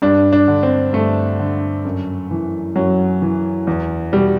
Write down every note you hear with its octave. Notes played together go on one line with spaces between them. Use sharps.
G2 D4
D4
D3
C4
G2 A3
D3
F#2
E3
F#2 F#3
E3
E2
B2 G3